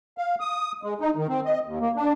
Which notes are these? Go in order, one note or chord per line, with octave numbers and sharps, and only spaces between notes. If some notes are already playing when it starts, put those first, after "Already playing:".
F5
D#6
G#3
D#4
D#3
C4
D#5
D#2
A#3
D4